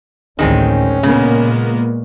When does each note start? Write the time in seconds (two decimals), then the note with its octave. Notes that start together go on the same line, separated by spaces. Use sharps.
0.39 A1 D2 A2 D#3 G#3 C4 C#4
1.03 A#2 C#3 G#3 A#3 B3